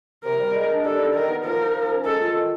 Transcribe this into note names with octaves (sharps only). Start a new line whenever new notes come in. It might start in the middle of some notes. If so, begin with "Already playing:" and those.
C3 A#4
G3
G#3
D4
G3 A4
D#4
D#3 A#4
B3
F3 A#4
D#4
F3
C#4
G#3 A4
F4
D#3